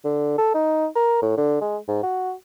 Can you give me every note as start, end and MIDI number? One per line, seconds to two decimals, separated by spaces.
0.05 0.34 50
0.38 0.52 69
0.54 0.86 63
0.96 1.19 70
1.22 1.34 45
1.37 1.57 50
1.61 1.77 56
1.88 1.98 44
2.03 2.32 66